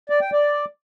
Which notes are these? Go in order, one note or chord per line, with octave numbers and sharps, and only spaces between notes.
D5
G5
D5